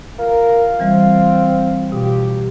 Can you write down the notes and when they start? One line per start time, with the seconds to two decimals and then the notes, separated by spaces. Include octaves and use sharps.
0.19 F4 A#4
0.80 E3 G3 C4
1.92 B2 F#3 F4 G4